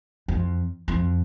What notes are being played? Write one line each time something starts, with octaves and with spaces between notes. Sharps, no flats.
F2
F2